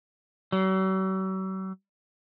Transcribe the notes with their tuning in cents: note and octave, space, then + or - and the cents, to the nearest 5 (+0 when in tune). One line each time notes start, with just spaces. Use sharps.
F#3 +45